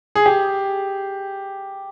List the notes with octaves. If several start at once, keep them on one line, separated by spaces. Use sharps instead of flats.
G#4
G4